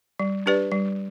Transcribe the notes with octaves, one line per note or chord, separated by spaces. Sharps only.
G3
D4 G4 B4 D5
G3